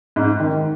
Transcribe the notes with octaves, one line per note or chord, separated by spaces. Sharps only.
G#2
D#3